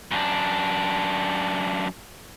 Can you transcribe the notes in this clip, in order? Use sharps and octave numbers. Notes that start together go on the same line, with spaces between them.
F#2 D4